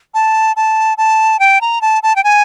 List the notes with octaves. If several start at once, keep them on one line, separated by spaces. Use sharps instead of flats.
A5
A5
A5
G5
A#5
A5
A5
G5
G#5